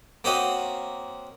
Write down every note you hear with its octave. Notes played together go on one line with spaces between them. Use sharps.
A#3 C4 C#4 F#4 D#5